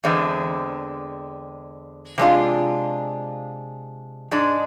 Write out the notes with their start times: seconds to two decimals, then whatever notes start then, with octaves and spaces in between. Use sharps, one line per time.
0.04 E2 D3 G#3 C4
2.18 C3 G#3 D4 F4
4.31 G#2 G#3 D4